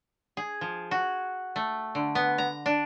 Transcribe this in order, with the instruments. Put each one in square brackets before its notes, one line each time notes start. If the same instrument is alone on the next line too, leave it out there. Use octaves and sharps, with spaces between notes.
[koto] G#4
F3
F#4
A3
D3
B3
A#5
D4